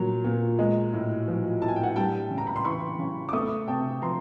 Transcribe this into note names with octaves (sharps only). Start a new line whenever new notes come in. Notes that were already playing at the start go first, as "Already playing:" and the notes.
Already playing: A#2 F#3
A#2
G#3
A2
F3
A2 A5
G#5
G5
F#5 G#5
G3 G5 A5
C#3
A#5
B5
C6
E3 B5 C#6
C#3
D6
A3 C#6 D#6
C3 G5 A5
F3 A#5 C6